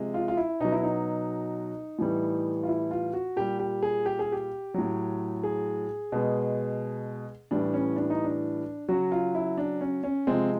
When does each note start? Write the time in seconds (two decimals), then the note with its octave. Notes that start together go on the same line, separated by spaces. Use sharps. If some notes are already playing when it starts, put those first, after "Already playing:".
Already playing: C3 F3 G#3
0.14 F4
0.28 F4
0.37 E4
0.60 B2 F#3 D#4
0.72 E4
0.83 D#4
1.98 A2 E3 G3
2.63 F4
2.68 E4
2.91 F4
3.13 F#4
3.36 A#2 G3 G4
3.59 G4
3.83 G#4
4.06 G4
4.19 G#4
4.32 G4
4.74 A2 F#3
5.43 G#4
6.12 B2 G#3
7.51 A2 E3 G3 D4
7.74 C#4
7.96 D4
8.10 D#4
8.24 D4
8.89 C#3 F#3 F#4
9.12 F4
9.35 E4
9.58 D4
9.81 C#4
10.04 C#4
10.27 C3 F3 G#3 C4